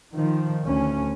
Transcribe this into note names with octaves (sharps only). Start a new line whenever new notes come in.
D#3 F3
D2 C#4